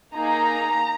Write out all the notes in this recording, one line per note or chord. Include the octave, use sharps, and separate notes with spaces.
A#3 D#4 G#4 A#5